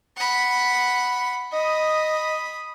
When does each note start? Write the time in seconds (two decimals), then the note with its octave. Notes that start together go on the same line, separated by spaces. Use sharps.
0.17 F#5 B5
1.53 D#5 B5 D#6